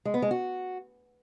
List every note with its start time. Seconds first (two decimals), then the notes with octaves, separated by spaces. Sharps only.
0.05 G#3
0.14 B3
0.22 G#3
0.31 F#4